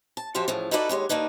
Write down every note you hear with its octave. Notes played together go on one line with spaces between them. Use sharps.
A5
F#2 F3 F#4 G4 C5 F5
A2 C#3 E3 F3
D#4 E4 F#4 A4 B4 D5
D#2 G3 G#3 C#5
D#3 A#3 D4 D#4 B4